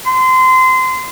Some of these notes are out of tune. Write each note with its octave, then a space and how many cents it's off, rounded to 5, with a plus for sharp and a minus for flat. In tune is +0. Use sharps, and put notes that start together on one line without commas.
C6 -25